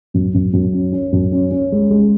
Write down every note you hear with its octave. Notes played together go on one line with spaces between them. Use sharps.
F#2
F#2
F#2
C#4
C#4
F#2
C#4
C#4
G#3
G#3